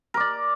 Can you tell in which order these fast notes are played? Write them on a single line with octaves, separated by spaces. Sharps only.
A#4 D6 D5